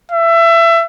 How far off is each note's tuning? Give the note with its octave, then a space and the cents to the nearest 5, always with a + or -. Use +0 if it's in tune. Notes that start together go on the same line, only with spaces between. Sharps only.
E5 +25